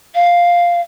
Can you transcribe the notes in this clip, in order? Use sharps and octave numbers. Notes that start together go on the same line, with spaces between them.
F5